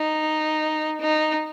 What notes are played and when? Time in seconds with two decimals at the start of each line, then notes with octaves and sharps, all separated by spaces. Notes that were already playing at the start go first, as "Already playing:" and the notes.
Already playing: D#4
1.01 D#4